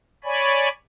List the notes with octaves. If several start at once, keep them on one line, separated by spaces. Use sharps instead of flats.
C#5 D5 G#5 B5